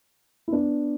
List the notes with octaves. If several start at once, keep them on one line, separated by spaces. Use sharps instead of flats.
E4
B3 D4